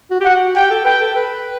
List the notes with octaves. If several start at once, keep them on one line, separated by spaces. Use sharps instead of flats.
F#4
G4
F#5
F#4
G4 G5
A4
B4 G5
A4
B4